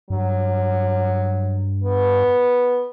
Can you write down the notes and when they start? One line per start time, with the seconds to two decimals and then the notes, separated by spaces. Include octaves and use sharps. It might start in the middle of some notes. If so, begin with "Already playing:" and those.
0.10 G2 F#3
1.84 B3